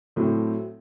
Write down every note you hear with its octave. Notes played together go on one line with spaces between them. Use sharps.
A2 F#3 A3 C4